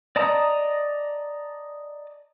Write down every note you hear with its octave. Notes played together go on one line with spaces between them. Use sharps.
D5 D#5 A5 A#5 D#6